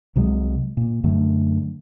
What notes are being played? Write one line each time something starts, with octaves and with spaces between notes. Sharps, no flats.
C2 C3 F#3 G#3
A#2
F#2 D3 A3